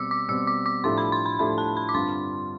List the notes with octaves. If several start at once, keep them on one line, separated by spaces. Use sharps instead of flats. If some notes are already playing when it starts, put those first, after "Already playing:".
Already playing: B2 G3 C4 D6 E6
D6
B2 G3 C4 E6
D6
D6
A2 F3 A3 D4 G4 C6
B5
C6
B5
A2 F3 A3 D4 G4 B5
A5
B5
D6
G2 D3 G3 C4 F4 C6